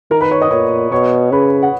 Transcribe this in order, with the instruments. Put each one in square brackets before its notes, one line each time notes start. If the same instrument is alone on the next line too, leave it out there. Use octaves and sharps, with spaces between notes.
[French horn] D#3 [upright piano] A#4 A#5
[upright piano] B4 B5
C#5 C#6
D#5 D#6
[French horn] A#2 [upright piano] C#5 C#6
[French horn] B2 [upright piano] C#5 C#6
[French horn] C#3 [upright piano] B4 B5
[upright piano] F#5